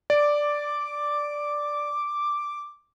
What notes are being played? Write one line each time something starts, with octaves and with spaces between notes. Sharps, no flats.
D5 D6